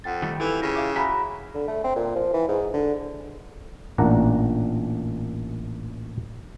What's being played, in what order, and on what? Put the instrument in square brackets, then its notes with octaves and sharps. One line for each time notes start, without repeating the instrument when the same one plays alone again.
[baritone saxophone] F2 [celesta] F#5 G5 A6
[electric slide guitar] D#3 G3 A3
[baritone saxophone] E3 [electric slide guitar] E4 F4 G4 [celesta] A4 F7
[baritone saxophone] C#3 [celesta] A#6
[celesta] E5 F5 D6
[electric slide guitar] F#4 E5 [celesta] G#5 A#5 B5
[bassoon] D3
A3
C4
A#2
F3
E3
G#2
D3
[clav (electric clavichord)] A1 A#2 D4 F#5 A#5